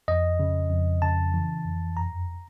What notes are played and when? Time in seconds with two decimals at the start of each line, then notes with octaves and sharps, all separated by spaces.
0.08 F2 D#5
0.40 C#3
0.70 F2
1.02 C#3 A5
1.34 E3
1.64 F2
1.97 F#2 A#5